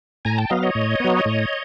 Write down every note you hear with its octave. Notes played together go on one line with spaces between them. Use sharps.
A2 G#5 A#5
G5 A5
F#3 B3 D#5 F5
C#5 D#5
A2
F#3 B3
A2